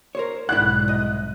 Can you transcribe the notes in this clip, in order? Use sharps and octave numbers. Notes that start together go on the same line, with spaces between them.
A#4 C5 C#5
B1 G#2 E4 D5 F#5 F#6
C2 D#5